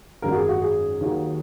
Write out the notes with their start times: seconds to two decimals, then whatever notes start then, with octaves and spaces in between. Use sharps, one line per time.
0.22 G#1 F#2 F#3 A#4
0.32 F#4
0.35 G#4
0.49 F#4
0.61 G#4
1.01 D#2 D#3 F#3